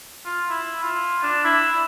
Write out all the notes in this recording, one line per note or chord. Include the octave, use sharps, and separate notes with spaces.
F4
E4
F4
D4
E4